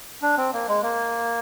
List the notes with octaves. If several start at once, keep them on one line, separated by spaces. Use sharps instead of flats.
D4
C4
A#3
G#3
A#3